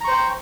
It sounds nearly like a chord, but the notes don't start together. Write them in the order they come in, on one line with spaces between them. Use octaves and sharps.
A#5 C#6 C5 G5